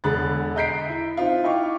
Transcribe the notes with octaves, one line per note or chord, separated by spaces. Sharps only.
E1 D3 G#4 B5 F#6 A6
D#5 A#5 G6 B6 C7 D7
E4
C4 D#4 F4
E4 D#5 F5 G5 C#6 D6